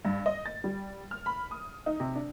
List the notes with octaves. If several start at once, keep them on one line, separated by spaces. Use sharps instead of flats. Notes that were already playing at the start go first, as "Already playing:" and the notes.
G2
D#5
A6
G3
F6
B5
D#6
D#4
C3
D4